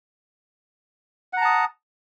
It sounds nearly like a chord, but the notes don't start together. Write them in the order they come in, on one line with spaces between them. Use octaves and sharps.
F#5 A#5 A5 D#6